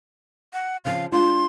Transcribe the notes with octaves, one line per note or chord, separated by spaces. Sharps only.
F#5
C#3 E3 F3 F5
G#3 D4 F4 C6